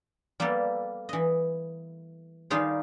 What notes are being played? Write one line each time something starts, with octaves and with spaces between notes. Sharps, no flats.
G3 A#3 B3 G4 A4
E3 D#5
D#3 G3 D#4 F4 G4 G#4